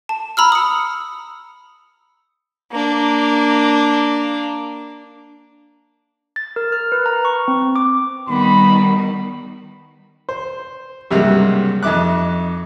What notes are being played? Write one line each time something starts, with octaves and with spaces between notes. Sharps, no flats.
A5
A#5 B5 E6 F6
D#6 C#7
A#3 D4
A6
A#4
F6
B4
A#5
C#6
C4
D6
D#3 G3 B3 B5
C5
C#2 G2 C3 F#3 G#3 A#3
F2 D#4 E5 D6 F#6